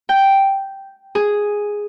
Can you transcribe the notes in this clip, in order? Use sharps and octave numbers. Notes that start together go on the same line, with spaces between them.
G5
G#4